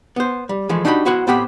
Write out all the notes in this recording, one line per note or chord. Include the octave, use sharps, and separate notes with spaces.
B3 C5
G3
E3 F3 G#3 A3
D4 D#4 F#4 G4 G5 B5
B3 E4 F#4 C5 F#5
A2 B3 C4 G4 F#5 B5